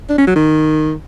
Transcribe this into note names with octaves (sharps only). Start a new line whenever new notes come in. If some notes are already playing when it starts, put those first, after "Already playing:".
D4
C#4
F#3
D#3